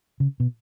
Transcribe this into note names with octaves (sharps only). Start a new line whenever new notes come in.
C#3
B2